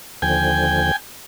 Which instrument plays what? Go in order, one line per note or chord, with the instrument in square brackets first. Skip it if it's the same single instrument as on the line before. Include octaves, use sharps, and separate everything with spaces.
[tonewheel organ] D#2 D3 F3 [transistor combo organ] G5 G#5